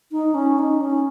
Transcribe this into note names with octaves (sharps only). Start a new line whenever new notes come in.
D#4
C#4
D#4
C#4